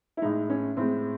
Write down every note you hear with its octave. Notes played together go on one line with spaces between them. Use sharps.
E4
A2 G#3 D#4
C#4
A2 G#3 C4